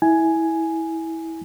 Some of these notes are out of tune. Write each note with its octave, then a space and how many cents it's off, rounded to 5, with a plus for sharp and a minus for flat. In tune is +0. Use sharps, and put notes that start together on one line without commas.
E4 -15 G#5 +5